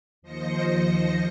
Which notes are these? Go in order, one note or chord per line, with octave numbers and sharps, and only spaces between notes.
D#2 F3 C5 D#5 A#6 C#7